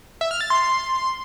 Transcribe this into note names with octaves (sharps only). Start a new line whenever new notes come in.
E5
F6
A6
C6